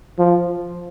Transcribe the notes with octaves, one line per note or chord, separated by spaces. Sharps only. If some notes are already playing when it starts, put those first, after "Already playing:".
F3